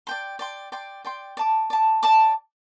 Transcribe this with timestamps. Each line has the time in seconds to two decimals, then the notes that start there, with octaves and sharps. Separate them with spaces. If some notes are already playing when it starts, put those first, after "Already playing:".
0.07 D5 G5 C6
0.39 D5 G5 C6
0.72 D5 G5 C6
1.05 D5 G5 C6
1.37 D5 A5 D6
1.70 D5
1.73 A5 D6
2.03 D5 A5 D6